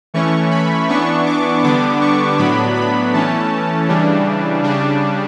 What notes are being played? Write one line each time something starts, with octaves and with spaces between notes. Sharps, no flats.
E3 A3 C#4 C#6
B5
E3 B3 D4 C#6
D6
D3 G3 B3 D4 D6
C#6
A2 F#3 B3 D4 B5
B5
E3 A3 C#4 A5
C#3 E3 G3 D4
C#3 G3 D4